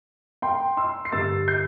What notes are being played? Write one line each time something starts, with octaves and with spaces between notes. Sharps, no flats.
G5 C6
C6 E6
C7
G2 D3 G3 E6 A6
G6 C7